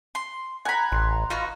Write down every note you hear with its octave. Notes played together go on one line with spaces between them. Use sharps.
C6
F#5 G#5 A#5 B5
A1 C6
D#4 F4 F#4 B4